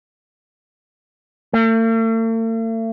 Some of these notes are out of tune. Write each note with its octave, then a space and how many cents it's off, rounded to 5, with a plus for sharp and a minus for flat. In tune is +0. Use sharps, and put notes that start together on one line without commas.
A3 +45